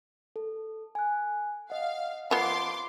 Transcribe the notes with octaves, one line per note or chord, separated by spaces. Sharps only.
A4
G#5 F#6
D#5 F5 F#5
F3 B3 C6 D6